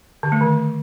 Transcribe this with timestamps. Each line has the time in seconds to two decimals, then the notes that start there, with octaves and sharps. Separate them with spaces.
0.23 D3
0.32 A3
0.41 D#3